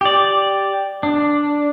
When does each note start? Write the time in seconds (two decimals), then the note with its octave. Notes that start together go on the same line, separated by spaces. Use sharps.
0.01 G4 D5
1.03 D4